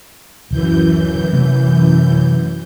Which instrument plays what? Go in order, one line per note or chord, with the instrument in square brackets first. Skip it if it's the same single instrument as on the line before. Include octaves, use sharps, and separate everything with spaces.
[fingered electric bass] D1 D3 [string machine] F#2 E3 G6
[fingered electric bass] C3 A3 C#4